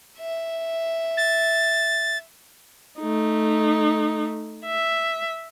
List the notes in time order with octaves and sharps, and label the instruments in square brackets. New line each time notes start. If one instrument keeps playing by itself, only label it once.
[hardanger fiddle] E5
[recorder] A6
[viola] A3 D#4
E5